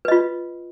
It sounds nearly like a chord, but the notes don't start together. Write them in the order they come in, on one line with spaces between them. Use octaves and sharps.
B4 D#5 F4